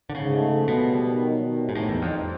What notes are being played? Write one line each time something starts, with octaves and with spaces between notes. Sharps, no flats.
D3
G#2 C#3
A3
F3
B2 B3
G3
D#3
F#3
D#3
C3
G#2
A2 D#4
E2 C4
F2
G3